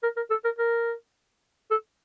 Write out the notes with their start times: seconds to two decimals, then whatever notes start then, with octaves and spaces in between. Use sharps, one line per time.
0.03 A#4
0.16 A#4
0.30 A4
0.45 A#4
0.58 A#4
1.71 A4